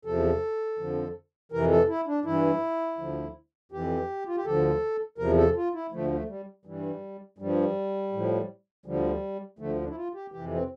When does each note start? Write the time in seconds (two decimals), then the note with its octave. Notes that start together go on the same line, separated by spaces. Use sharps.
0.05 E2 C3 F3 A4
0.78 F2 D3 F3
1.52 F2 C3 E3 A#4
1.70 A4
1.88 E4
2.07 D4
2.25 G2 E3 E4
2.99 D2 D3 F3
3.72 F2 E3 G4
4.27 F4
4.36 G4
4.45 D2 D3 F3 A4
5.18 E2 C3 F3 A#4
5.37 A4
5.56 F4
5.74 E4
5.92 D2 D3 F3 A3
6.10 A3
6.29 G3
6.65 G2 E3 G3
7.38 G2 F3 G3
8.12 A2 F3
8.86 D2 D3 F3 G3
9.59 D2 D3 F3 A3
9.81 D4
9.88 E4
9.95 F4
10.14 G4
10.32 F2 C3 E3 G4
10.51 C4